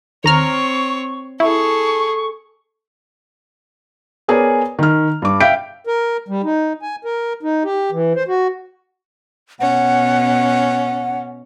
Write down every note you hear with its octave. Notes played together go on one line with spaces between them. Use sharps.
D#2 C4 C#5 A#5 C#6 F6
E4 G#4 A4 C#6
B3 G#4 A#4 C#5 D5 G#5
D#3 F6
G2 D6
E5 F5 G5 G6 B6 D7
A#4
G3
D#4
G#5
A#4
D#4
G4
E3
C5
F#4
B2 C#4 F#5